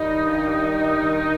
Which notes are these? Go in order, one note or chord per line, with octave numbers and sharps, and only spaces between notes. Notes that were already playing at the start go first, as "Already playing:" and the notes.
Already playing: D#3 G3 D#4
G2
G3
G2
D#2